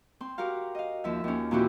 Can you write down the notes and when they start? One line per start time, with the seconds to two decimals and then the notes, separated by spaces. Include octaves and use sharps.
0.21 C4 C6
0.38 F#4 G4 A#4 F5
0.75 D#5 F5
1.04 D#2 F3 E5
1.24 D#2 C#4
1.51 A#2 E3 C4 E4 F#4 G4